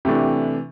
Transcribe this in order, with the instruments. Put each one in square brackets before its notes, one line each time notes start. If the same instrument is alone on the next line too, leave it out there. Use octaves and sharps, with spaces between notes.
[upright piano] C3 E3 A3 D4 G4